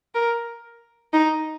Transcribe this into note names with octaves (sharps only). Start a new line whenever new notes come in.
A#4
D#4